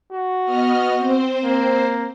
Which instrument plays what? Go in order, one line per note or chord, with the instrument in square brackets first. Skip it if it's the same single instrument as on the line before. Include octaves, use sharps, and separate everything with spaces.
[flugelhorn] F#4
[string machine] B3 D#5 F6
C4 C5
[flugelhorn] A#3